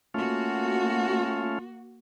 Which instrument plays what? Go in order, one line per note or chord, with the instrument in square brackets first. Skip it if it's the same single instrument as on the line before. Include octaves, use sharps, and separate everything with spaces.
[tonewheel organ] A3 C#4 F4 [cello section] A#3 F#4